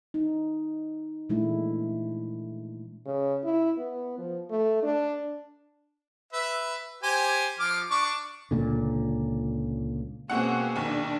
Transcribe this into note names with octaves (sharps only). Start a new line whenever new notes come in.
D#4
A#2 E3 G#3 A3 D4 E4
C#3
E4
B3
F3
A3
D4
B4 E5
G4 C5 G#5
F3 D6 F6
D4 C#6 D6
C#2 A#2 D3
B2 G#3 A#3 C4 C#4 F#5
A#1 D#2 D4